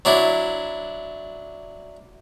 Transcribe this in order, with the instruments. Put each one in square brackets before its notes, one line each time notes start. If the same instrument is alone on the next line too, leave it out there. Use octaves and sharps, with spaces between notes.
[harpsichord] F#3 D4 E4